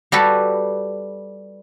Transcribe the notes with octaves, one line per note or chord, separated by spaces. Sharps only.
G3 F#4 G4 A4 B4